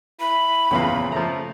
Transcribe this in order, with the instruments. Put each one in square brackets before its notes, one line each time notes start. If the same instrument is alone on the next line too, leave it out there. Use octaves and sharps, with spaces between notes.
[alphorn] E4 [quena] B5
[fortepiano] A#1 E2 A#2 [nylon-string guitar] C#3 F4 F5 [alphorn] E3
[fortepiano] F3 A#5 [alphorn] A3